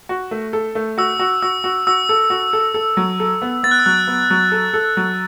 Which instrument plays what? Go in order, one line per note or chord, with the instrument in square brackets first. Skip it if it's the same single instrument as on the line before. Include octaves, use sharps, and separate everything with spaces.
[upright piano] F#4
A3
A4
A3
[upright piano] F#4 [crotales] E6
[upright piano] F#4
[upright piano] F#4 [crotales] E6
[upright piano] F#4
[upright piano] F#4 [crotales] E6
[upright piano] A4
F#4
A4
A4
F#3
A4
B3
[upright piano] B3 [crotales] A6
[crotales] F#6
E6
[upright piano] F#3 [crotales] F#6
[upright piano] B3
F#3
A4
A4
F#3